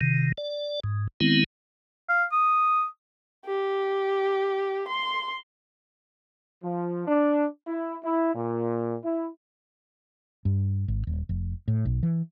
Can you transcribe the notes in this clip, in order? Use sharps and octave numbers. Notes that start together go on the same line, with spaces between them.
C3 D#3
D5
G#2
D#3 G#3 B3 C4 E4
F5
D#6
G4
C6
F3
D4
E4
E4
A#2
E4
G2
G#1
D#1
F1
A2
B1
E3